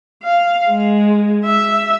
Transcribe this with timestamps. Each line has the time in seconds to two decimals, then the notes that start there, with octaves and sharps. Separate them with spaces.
0.23 F5
0.70 G#3
1.45 E5